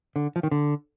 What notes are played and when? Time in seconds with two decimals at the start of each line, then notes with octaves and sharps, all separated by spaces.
0.16 D3
0.36 F3
0.43 D#3
0.51 D3